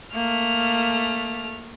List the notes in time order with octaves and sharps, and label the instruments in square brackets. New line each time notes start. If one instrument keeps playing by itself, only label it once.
[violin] A3 F6 [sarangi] A#3